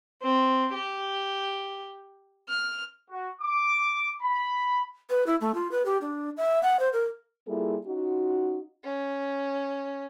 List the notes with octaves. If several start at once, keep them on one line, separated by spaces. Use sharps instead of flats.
C4
G4
F6
F#4
D6
B5
B4
E4
A3
F4
B4
G4
D4
E5
F#5
C5
A#4
G3 A#3 E4 F4 G#4 A4
C#4 D#4 F4 F#4
C#4